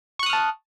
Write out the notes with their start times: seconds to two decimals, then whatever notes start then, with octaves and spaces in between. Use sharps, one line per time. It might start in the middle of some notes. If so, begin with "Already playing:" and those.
0.19 C#6
0.23 F#6
0.26 D#6
0.30 F6
0.33 A5